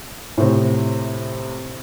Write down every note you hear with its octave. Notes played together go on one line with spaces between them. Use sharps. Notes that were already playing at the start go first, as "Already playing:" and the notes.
A2 C3